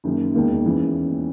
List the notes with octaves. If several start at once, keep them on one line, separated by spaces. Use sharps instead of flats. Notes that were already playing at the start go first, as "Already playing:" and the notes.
F#1 F#2 D#3
E1 D#2 D#3 A#3
C#3 E3